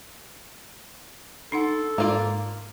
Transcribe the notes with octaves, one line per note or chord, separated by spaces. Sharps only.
D4 D#4 A4 F#5
G#2 A#3 F4 D5